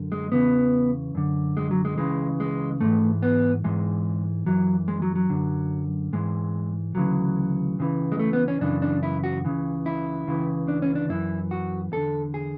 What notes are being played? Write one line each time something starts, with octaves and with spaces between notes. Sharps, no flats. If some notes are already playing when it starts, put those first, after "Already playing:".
Already playing: F#2 D3
G#3
E2 C#3 E3 B3
F#2 D3
G#3
F#3
G#3
C#2 C#3 E3 G#3
G#3
G#2 E3 A3
B3
G#2 E3 G#3
F#2 E3 F#3
G#3
F#3
F#3
F#2 D3
G#2 E3 G#3
D2 C#3 E3 F#3
C#2 C#3 E3
G#3
A3
B3
C#4
F#2 C#3 E3 D4
D4
E4
F#4
C#2 C#3 E3
E4
C#2 C#3 E3
D4
C#4
D4
F#2 E3 E4
F#4
E2 D3 A4
G#4